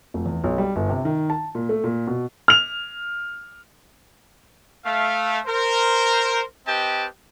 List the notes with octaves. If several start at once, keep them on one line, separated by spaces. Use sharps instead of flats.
F1
E2
B1
G3
G1
C3
D#3
A5
A#2
A3
A#2
B2
F6 F7
A3 F5
A#4 C5
C4 G4 B4 D#5 G5 A5